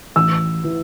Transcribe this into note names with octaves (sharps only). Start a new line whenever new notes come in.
A1 E6
E3